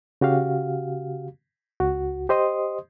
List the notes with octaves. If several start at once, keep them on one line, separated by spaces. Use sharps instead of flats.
C#3 F#4 G4 F5
C#2 F#4
G4 C5 D#5 C6 D#6